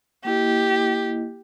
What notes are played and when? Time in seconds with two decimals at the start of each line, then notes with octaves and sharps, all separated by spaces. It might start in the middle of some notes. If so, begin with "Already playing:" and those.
0.25 A#3 E4 G4 D#5